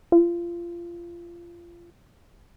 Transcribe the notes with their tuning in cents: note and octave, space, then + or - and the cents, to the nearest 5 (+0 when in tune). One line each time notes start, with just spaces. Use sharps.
F4 -25